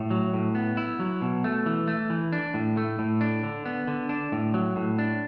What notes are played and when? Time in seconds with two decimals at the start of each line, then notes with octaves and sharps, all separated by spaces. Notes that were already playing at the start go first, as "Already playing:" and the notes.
Already playing: A2
0.10 F#3
0.33 A2
0.55 B3
0.77 E4
1.00 F#3
1.22 B2
1.44 A3
1.66 E3
1.88 A3
2.10 E3
2.33 D4
2.54 A2
2.77 A3
2.99 A2
3.21 D4
3.43 D3
3.66 B3
3.87 D3
4.09 D4
4.32 A2
4.54 F#3
4.76 A2
4.99 D4